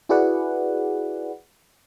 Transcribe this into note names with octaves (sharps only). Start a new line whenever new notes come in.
E4 F#4 G#4 B4 D5 F#5